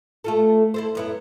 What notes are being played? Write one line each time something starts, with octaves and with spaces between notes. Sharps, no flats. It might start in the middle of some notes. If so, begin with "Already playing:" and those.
A3 F4 A4
E4 A4 C5
F#2 B3 E4